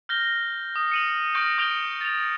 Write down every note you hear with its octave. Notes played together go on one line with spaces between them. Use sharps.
F6 G6 A#6 G7
D#6
C#7 D#7 F#7
C#6 F6 G6 A#6 C#7
C#6 D#6 G6 D7 F7 G7
A6 F7